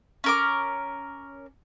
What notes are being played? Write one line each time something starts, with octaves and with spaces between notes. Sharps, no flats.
C#4 A#4 D6